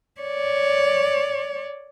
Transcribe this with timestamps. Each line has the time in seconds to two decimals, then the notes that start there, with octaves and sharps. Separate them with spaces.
0.21 C#5 D5